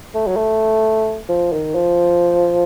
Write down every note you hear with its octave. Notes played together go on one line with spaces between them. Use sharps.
A3
F#3
A3
F3
D#3
F3